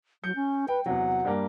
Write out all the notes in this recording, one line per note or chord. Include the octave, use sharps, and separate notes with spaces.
F#3 G6 C#7
C#4
B4 G5
E2 C3 F#3 F#5
G2 G3 A#3